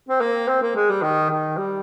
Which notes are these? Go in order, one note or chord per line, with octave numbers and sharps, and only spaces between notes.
C4
A#3
C4
A#3
G#3
G3
D#3
D#3
G3